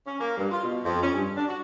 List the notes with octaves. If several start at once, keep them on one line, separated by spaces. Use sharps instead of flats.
C#4
A#3
G2
F4
B2
F2
C#4
G2
D4
F#4